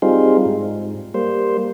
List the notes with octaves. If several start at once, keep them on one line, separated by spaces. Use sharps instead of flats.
G3 C4 D#4 F4 G#4
G#2
G3 A#3 C5